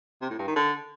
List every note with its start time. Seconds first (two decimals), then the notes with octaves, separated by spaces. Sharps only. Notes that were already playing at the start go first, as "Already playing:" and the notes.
0.22 C3
0.30 A2
0.39 G2
0.48 D#3
0.56 D3